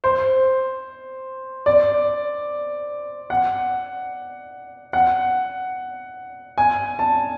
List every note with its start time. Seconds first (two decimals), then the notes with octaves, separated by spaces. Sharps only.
0.04 C5
1.66 D5
3.30 F#5
4.93 F#5
6.58 G#5
6.99 A5